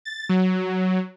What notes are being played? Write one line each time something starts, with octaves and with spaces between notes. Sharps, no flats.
A6
F#3